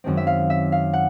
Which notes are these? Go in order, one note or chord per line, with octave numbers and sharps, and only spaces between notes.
F#2 D#3 G#3 C4
E5
F5
E5
F5
F#5